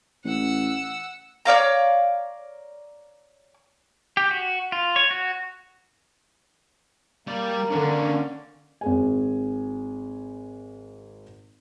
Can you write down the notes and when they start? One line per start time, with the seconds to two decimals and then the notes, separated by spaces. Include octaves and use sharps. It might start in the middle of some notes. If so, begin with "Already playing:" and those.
0.25 A1 F#5 E6
1.45 C#5 D5 F5 A#5
4.17 G4
4.31 F#4
4.72 F4
4.96 C#5
5.11 F#4
7.27 G3 A#3 D5
7.71 D3 C#4 D4
8.81 G#1 G#4 G#5